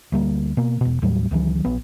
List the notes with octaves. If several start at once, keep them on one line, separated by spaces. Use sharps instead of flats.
D2 G3 A#3
B2 A#3
E1 B2
D#2 A2 F#3 G3
C#2 D#3 E3 F#3
A#1 B3